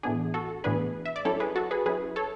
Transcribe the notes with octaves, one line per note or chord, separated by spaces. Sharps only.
A2 E3 B3 D4 G#4
F#4 A4
A2 E3 B3 D4 G#4 B4
E5
D5
F#3 C#4 E4 A4 C#5
G#4 B4
F#4 A4
G#4 B4
F#3 C#4 E4 G#4 B4
A4 C#5